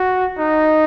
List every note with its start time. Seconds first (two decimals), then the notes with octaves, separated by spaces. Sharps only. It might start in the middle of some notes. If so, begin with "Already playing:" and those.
Already playing: F#4
0.39 D#4